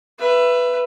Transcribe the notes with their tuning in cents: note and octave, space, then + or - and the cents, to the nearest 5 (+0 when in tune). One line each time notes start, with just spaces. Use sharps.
B4 +0 E5 +20